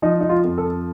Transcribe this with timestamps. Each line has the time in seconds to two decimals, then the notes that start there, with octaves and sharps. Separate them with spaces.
0.02 F3 D#4
0.21 D#4
0.29 F4
0.44 F2
0.58 A4